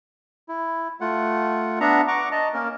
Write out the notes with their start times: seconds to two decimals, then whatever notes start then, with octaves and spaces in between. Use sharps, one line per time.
0.49 E4
1.01 A3 F4 F#5
1.80 B3 D4 E5 F#5 A#5
2.08 F#5 A#5 C#6 D6
2.31 D#5 A5 A#5
2.54 A#3 C#4 A#4